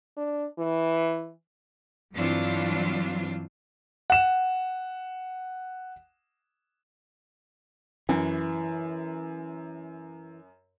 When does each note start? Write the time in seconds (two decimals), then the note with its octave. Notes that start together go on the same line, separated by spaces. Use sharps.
0.17 D4
0.59 E3
2.13 G2 E3 F#3 C4 D4 F4
4.10 F#5 E7
8.09 F#2 E3